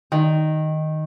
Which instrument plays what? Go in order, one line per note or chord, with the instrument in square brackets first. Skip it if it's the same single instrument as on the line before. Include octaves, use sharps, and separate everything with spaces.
[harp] D#3